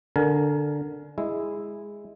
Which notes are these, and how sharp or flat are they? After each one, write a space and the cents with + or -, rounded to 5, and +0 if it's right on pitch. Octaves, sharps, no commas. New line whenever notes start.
D3 +0 A#4 +0 G#5 +40
G#3 -10 E4 +0